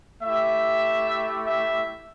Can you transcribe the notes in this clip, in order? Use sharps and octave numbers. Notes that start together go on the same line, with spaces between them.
A3 E4 G4 E5
E5